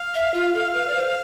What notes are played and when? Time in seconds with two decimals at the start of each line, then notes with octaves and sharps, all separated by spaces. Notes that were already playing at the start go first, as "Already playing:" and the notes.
Already playing: F5
0.14 E5
0.34 F4
0.54 A4
0.74 B4
0.88 D5
0.95 C5